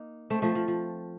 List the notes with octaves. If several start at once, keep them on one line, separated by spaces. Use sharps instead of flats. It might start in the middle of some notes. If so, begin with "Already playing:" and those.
Already playing: A#3 D#4
A3 C4
F3 A3
F3
F3